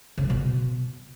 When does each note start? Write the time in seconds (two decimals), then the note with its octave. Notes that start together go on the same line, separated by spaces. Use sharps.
0.18 C#3
0.24 F#3
0.30 B2